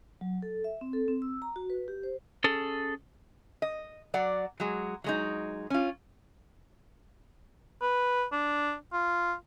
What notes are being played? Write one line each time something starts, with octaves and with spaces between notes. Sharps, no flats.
F#3
A4
E5
C4
A4
C4
E6
A#5
F#4
B4
G4
C5
C#4 G#4 A4
D#5
F#3 D5 F#5
F#3 G#3
F#3 G#3 D#4
C#4 F4
B4
D4
F4